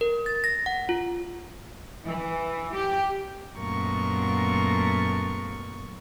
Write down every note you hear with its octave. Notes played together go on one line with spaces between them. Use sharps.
A#4
A6
A#6
F#5
F4
E3
G4
F#2 A#2 A3 B3 A#4 C#6